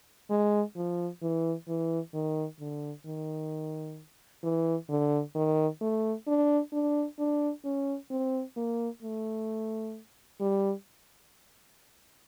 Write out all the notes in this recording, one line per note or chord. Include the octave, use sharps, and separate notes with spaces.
G#3
F3
E3
E3
D#3
D3
D#3
E3
D3
D#3
A3
D4
D4
D4
C#4
C4
A#3
A3
G3